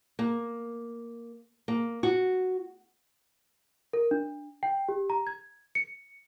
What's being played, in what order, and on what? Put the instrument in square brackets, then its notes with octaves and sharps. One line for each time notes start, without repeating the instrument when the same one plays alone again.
[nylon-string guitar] A#3
A#3
F#4
[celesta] A#4
D4
G5
G4
A#5
G#6
C#7